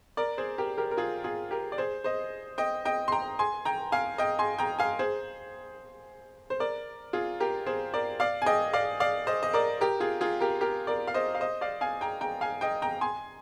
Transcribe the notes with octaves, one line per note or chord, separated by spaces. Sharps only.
A#4 D5
G#4 C5
G4 A#4
G4 A#4
A#4
F4 G#4
F4 G#4
G4 A#4
D5
G#4 C5
C5 D#5
D#5 G5
D#5 G5
C6
G5 A#5
G#5 C6
G5 A#5
F5 G#5
D#5 G5
G#5 C6
G5 A#5
F5 G#5
G#4 C5
C5
A#4 D5
F4 G#4
G4 A#4
G#4 C5
A#4 D5
D5 F5
G#5
D#5 G5
D5 F5
D5 F5
C5 D#5
D#5
A#4 D5
G4 A#4
F4 G#4
F4 G#4
G4 A#4
G4 A#4
A#4 D5
F5
C5 D#5
F5
C5 D#5
D5 F5
F5 G#5
G5 A#5
G5 A#5
F5 G#5
D#5 G5
G5 A#5
G#5 C6